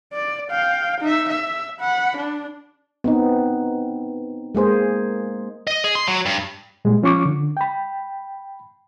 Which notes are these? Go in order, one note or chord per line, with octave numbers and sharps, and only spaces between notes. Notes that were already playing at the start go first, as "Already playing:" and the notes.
D5
F5 G5
D#4 E5
E5
F#5 B5
D4
B3 C4 D#4
G#3 A#3 G#4 C5
D#5
G#4
C6
F#3
G2
A#2 G3 G#3
F3 C#4 F4 C#6 D6
D3
G5 B5